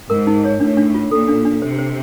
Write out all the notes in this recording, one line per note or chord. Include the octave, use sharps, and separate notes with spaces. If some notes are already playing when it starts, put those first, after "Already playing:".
G#2 A#4
D#4
C#5
A2 D4
D4
F4
A#2 A4
D4
D4
C3 C5
C5